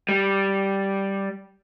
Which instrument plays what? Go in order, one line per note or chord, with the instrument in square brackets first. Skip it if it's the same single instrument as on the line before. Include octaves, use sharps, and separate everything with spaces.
[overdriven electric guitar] G3